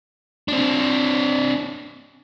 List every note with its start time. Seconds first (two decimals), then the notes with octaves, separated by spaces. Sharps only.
0.48 C4 D4